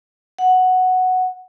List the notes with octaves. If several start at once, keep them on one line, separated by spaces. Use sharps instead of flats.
F#5